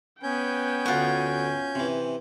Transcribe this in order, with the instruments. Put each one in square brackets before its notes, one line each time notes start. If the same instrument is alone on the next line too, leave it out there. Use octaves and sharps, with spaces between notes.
[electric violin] B3 G5 [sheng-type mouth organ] C#4 G#5 G6
[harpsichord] D2 C#6 [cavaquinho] F4 F#5
[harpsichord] C3 E3